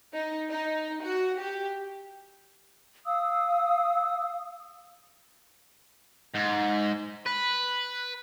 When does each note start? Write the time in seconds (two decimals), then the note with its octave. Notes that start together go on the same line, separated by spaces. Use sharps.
0.13 D#4
0.49 D#4
1.03 F#4
1.40 G4
3.06 F5 D#6 E6
6.35 G#2
7.26 B4